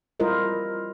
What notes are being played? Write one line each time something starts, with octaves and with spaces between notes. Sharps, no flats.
G3 E4 F4 A#4 C5 D#5